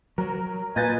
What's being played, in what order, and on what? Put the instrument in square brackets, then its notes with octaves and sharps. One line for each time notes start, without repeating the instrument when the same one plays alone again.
[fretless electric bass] F#3 [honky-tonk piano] A#4
[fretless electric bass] A#2 [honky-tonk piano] F4 G6 A6 [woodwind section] B4 D#5 G#5